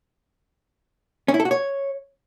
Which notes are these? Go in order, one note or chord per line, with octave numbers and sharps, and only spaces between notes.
C#4
E4
A4
F#4
C#5